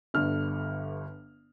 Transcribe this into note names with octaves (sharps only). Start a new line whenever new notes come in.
G1 G2 D3 F6